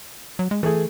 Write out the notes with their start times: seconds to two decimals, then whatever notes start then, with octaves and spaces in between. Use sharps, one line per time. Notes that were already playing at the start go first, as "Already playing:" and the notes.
0.39 F#3
0.51 G#3
0.63 E3 A3 G#4